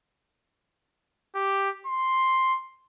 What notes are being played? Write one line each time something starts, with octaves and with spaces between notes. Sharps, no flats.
G4
C6